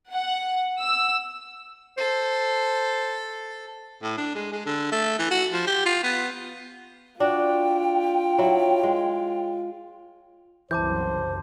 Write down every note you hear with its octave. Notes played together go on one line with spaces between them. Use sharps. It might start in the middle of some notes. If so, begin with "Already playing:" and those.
F#5
E6
A4 C5
A2
D4
G#3
G#3
D3
A3
E3
F#4
F3
G4
F4
B3
D4 F4 F#4 G5
F#3 E4
G#3
F#1 C2 F#2 E3 C5 A5 D6 G6